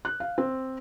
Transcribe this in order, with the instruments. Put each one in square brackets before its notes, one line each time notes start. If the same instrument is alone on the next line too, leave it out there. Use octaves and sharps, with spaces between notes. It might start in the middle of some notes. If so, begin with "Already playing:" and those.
[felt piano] F#6
F5
C4